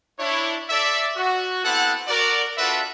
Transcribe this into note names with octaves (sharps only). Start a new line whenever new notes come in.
D4 E4 C#5
A4 D5 E5
F#4
B3 C4 E4 A4 F#5
F#4 A#4 D5
D4 F4 F#4 A4 B4 E5